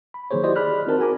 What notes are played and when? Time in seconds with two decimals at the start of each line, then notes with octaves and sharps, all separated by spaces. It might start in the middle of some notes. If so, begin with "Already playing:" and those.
0.14 B5
0.31 D#3 F#3 A#3 G#4 C5 C#5
0.44 E4 F#4 G4 C5 D5 D#5
0.56 G#4 D5 B5 F6 F#6
0.87 C4 D#4 F#4 A#4 C5 A5
0.98 F#4 G#4 A#4 G#5 A#5 D6